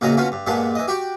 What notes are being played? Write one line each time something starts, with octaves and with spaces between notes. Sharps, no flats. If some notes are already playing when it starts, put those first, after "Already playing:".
E2 A#2 C#3 F#4 D#5 A#5
B2 C#4 F4 F#4
G2
G2 A#2 G#3 B3 A5
E3 D#5
F#4 G4 F#5 G5 C#6